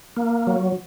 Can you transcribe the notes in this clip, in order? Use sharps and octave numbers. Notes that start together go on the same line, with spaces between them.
A#3
F#3